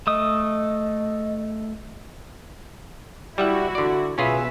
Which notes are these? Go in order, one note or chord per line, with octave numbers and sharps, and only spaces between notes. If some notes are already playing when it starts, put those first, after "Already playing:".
A3 D#5 D#6
G3 E4 F#4 E5 F#5
D3 D5
B2 C#4 F4 G#4 B4 E5